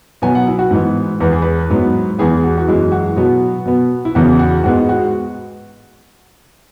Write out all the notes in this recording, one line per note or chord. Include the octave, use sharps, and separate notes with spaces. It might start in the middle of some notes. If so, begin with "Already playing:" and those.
B2 F#3 B3 G#5
F#5
E4
F#4
G#2 E3 B3
E2 E3 B3 B4
G#4
B4
G#2 F#3 B3
E2 E3 B3 G#4
F#4
F#4
F#2 E3 G#3 E4
F#4
B2 F#3 B3
B2 B3
E4
E2 C#3 E3 B3 F#4
F#4
G#2 G#3 B3 F#4
F#4